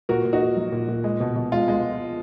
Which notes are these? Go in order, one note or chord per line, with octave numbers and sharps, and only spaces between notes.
A#2 F#4 A#4
A#2
D#4 F#4
A#3
F#3
A#2
A#2
G#3
B2
B2
G#3 F4
G#3